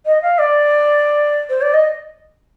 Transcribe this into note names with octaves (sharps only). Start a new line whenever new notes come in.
D#5
F5
D5
C5
D5
D#5